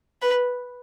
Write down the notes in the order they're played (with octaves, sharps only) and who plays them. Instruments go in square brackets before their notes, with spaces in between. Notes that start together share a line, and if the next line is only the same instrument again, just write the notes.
[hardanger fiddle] B4